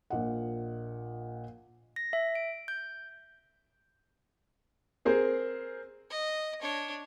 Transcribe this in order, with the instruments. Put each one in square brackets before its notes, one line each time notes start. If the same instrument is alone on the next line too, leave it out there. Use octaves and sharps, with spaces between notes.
[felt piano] A#1 A#2 D#5 F#5
[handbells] A#6
E5
D7
G6
[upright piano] C4 G#4 A#4 C5
[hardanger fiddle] D#5
D4 C#5